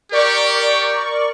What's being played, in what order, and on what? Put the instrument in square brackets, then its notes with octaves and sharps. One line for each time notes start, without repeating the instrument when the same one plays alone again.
[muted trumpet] G4 [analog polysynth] A#4 D5 C#6